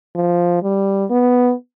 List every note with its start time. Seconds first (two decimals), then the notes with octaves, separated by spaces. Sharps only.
0.16 F3
0.63 G3
1.10 B3